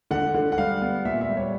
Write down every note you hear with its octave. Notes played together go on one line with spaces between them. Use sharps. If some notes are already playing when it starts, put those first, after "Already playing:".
D3 F#5
D3
F#5
G3 F5
B3
A#2 E5
E5
G3
C#5